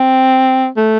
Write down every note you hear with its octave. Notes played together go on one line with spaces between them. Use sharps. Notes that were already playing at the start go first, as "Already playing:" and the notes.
Already playing: C4
A3